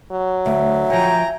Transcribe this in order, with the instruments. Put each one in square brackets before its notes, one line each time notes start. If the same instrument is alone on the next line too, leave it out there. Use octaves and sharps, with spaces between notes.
[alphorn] F#3
[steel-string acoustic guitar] D2 [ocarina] E5
[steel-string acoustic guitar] F3 C#5 [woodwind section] G5 G#5 A#5